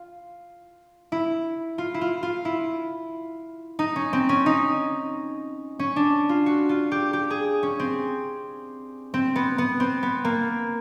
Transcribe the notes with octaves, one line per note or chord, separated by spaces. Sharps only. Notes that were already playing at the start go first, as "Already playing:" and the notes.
Already playing: F4
E4
F4
E4
F4
F4
E4
D#4
C#4
C4
C#4
D#4
C#4
D4
F4
F#4
F4
G4
G4
G#4
C#4
C4
C4
B3
B3
C4
B3
A#3